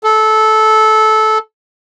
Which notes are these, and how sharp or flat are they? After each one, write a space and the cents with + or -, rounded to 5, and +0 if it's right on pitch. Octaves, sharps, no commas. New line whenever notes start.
A4 -15